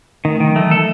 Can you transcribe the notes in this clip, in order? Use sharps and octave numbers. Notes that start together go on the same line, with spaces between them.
D#3 A3
A3
D#3
F#3
E3 A3
A4